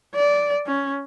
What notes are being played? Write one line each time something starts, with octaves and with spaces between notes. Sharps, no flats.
D5
C#4